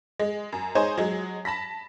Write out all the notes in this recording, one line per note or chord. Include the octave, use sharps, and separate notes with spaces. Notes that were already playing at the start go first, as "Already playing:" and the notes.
G#3
F#2
G#3 D#4 C5 C#5 G#5
F#3 G#3
A5 B5 A#6 B6